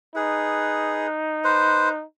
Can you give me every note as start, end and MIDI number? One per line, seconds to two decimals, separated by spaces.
0.16 2.03 63
0.16 1.07 68
0.16 1.07 71
1.44 1.89 71
1.44 1.89 72